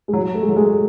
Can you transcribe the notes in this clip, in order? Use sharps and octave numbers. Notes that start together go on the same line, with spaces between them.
G#3
F#3
A3
G#3
F#3
G#3